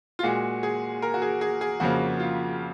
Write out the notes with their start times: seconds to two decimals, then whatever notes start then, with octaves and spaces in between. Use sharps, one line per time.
0.19 F4
0.23 A#2 G#3 F#4
0.63 G#4
1.02 A#4
1.14 F#4
1.22 G#4
1.41 G#4
1.61 G#4
1.80 F2 C#3 F3 A#3 F#4
2.20 F4